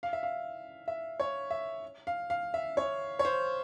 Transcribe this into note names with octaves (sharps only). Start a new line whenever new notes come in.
F5
E5
F5
E5
C#5
E5
F5
F5
E5
C#5
C#5
C5